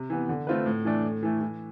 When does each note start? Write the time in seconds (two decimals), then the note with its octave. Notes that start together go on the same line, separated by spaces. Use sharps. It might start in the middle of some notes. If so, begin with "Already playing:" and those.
Already playing: C3
0.10 E3 B3
0.29 D3
0.47 A3 C4 F4 B4
0.66 A2
0.85 E3 A3 D4
1.04 A2
1.23 E3 A3
1.41 E3